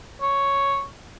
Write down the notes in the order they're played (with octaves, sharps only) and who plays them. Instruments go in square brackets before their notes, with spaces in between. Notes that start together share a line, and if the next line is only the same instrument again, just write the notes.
[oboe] C#5